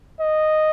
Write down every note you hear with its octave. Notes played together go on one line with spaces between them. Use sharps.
D#5